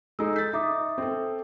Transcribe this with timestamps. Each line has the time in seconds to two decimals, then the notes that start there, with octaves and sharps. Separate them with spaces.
0.19 G#3 D#4 A4 E6
0.36 G6 A6 B6
0.53 D#4 E5 D6 D#6
0.98 C4 A4